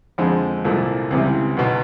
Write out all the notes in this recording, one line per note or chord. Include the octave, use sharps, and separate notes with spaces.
F2 D3 F3 G#3
C2 A#2 F3 A4
C#2 C3 E3 G3
B1 B2 F#3